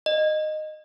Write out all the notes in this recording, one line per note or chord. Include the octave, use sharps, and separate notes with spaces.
D#5